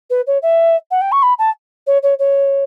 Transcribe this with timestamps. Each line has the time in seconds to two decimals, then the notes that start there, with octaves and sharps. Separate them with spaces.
0.10 B4
0.27 C#5
0.42 E5
0.91 F#5
1.01 G5
1.12 C#6
1.22 B5
1.38 A5
1.86 C#5
2.03 C#5
2.19 C#5